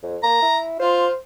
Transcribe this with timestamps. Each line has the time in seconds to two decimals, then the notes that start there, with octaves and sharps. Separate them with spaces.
0.03 F2
0.23 A#3 A#5
0.42 E4
0.79 F4 C5